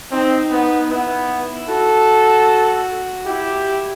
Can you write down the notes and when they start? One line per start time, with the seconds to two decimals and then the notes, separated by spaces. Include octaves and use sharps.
0.12 C4 D#4
0.51 B3
0.90 B3 E4
1.68 F#4 A4
3.25 E4 G4